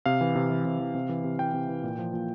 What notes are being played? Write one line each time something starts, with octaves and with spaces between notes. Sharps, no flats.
C3 F5
E3
C3
E3
C3
E3
C3
E3
C3
E3 G5
C3
E3
A#2
F3
A#2